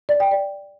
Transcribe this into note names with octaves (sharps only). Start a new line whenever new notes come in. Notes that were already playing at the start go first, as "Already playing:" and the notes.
D5
G5
D5